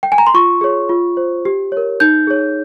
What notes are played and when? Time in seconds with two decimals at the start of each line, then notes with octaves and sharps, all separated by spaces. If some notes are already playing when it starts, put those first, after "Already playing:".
0.03 G5
0.12 G#5
0.18 A#5
0.27 C6
0.34 F4 C#6
0.61 G#4 C#5
0.89 F4
1.17 C5
1.45 G4
1.72 A#4 C#5
2.00 D#4 G6
2.27 G#4 C#5